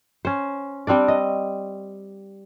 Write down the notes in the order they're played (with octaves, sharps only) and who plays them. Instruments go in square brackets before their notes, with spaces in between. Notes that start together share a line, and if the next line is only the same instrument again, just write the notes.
[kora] C#4 C5
G3 C4 D4 D5
D#5